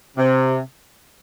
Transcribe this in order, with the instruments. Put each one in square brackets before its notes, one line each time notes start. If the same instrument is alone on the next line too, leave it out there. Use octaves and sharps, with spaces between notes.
[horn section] C3